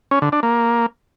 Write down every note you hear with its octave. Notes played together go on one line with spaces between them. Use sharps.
C#4
D3
D4
A#3